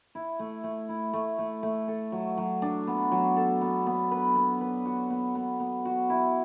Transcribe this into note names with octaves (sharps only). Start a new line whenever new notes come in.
E4
A3
A3
E4
A3
A3
A3
A4
F#3
F#3
D4
B3
F#3
A4
B3
B3
B4
B3
B4
F#4
B3
B3
B3
F#4
E4